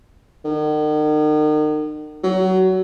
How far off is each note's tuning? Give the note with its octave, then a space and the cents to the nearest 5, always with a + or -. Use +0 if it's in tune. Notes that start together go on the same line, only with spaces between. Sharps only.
D#3 -40
F#3 +20